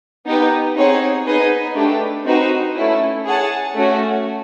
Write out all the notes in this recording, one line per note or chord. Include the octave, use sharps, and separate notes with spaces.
B3 D#4 G4 B4
C4 D#4 G#4 C#5 F#5
B3 D#4 G#4 B4 D#5
A3 D4 G4 B4
C4 D#4 F#4 B4
A3 C#4 E4
G#4 C#5 F#5 A5
A3 C#4 F#4